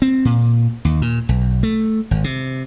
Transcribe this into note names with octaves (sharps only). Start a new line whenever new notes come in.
C4
A#2
D#2
A#2
B1
A3
G#1
C3